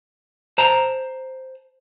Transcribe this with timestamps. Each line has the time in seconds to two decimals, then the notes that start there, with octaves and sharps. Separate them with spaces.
0.58 C5 A5 A#5